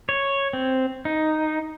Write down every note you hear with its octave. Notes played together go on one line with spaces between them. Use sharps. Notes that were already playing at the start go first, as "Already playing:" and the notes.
C#5
C4
D#4